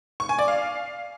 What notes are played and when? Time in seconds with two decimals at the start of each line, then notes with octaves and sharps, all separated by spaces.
0.20 C#6
0.29 G#5
0.39 D5
0.48 F5